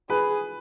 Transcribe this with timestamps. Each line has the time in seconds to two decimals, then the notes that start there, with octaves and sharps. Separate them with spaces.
0.10 G#4 B4